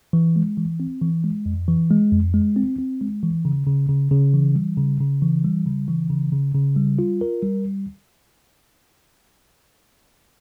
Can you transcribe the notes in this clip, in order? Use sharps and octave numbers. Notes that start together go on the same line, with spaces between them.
E3
G#3
E3
C4
E3
G#3
F2
E3
G#3
F2
G#3
C4
C4
G#3
E3
C#3
C#3
C#3
C#3
E3
G3
C#3
C#3
E3
G3
C#3
E3
C#3
C#3
C#3
G3
F4
A#4
G3